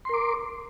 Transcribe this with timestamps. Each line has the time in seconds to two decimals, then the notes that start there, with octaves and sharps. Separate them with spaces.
0.05 C6
0.09 A#4
0.14 D6